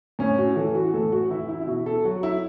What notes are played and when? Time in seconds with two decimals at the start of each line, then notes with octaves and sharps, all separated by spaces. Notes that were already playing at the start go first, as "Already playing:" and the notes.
0.19 A2 C#4
0.39 F#4
0.56 E3 A4
0.75 F#4
0.94 A2 A4
1.12 F#4
1.31 E3 E4
1.49 E4
1.61 E4
1.67 B2 F#4
1.86 A4
2.04 F#3 F#4
2.23 E4